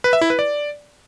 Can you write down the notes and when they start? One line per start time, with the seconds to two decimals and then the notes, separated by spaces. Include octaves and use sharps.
0.04 B4
0.13 E5
0.21 E4
0.30 B4
0.39 D5